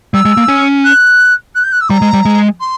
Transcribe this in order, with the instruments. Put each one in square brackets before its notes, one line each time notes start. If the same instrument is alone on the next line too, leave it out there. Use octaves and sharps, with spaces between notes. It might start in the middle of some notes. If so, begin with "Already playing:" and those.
[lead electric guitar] G3 [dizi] E6
[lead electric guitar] G#3
A#3
C#4
[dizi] F#6
F#6
G6
F#6
E6
[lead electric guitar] G3 [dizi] A#5
[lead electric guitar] G#3
G3
G#3
[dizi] C6